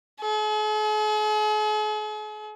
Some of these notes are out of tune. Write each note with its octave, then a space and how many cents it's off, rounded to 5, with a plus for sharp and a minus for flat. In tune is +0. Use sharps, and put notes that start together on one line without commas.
G#4 +45